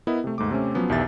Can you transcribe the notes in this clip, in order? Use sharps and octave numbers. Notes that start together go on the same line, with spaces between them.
B3 E4 A#4 D#5
C3 A3
D#2 G#2 A3 D6
C3 A3 C4 C#4
F3 F#3 B3 C#4
B1 E2 D#3 G4 E5 A6